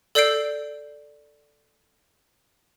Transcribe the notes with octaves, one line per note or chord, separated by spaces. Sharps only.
A4 D5 E6 G6 C7 D7